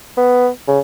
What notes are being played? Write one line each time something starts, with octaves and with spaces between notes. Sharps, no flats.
B3
C#3